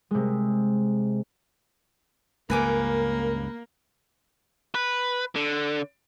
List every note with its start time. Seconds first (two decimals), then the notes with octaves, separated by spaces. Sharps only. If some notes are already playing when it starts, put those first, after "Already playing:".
0.11 C3 G#3
2.50 C#2 G2 C#3 A#3 A#4 B4 G#5 D6
4.75 B4
5.36 D3